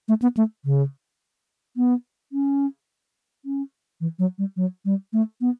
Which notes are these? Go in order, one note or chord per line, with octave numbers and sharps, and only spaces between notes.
A3
B3
A3
C#3
B3
C#4
C#4
E3
F#3
G3
F#3
G3
A3
B3